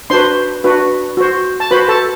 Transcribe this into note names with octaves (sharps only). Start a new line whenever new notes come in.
D4 F#4 B4 C5 C6
D4 F#4 B4
F#4 C5
A5
F#4 B4 C5 B5
A4 A5